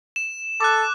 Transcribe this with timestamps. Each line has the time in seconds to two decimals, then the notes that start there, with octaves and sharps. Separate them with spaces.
0.16 E7
0.61 A4 D6 F#6